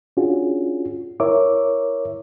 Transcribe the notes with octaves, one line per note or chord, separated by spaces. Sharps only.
C#4 D4 F4 F#4 G#4
E4 A#4 C#5 E5 D6